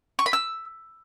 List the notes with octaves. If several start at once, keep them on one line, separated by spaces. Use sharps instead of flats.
C#6
B5
E6